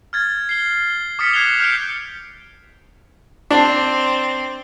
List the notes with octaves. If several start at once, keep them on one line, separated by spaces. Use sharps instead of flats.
F6 G#6 A6
C7 G7
D6 D#6 F6 A6 B6 C#7
F#6 G#6 C7 F7 G7
F6 G6 C#7 D7 G7
C4 D4